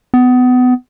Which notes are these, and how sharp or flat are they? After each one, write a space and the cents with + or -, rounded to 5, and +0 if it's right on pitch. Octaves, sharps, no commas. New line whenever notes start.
B3 +25